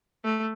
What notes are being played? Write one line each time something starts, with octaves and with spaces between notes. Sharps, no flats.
A3